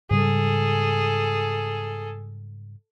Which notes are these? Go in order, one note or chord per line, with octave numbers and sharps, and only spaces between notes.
G#2 C#3 G3 G#4 A4